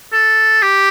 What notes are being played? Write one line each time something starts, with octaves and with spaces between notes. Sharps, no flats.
A4
G4